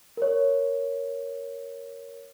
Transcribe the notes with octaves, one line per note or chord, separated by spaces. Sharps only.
A#4 C#5